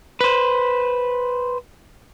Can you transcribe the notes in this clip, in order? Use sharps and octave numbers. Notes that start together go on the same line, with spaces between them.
B4 C5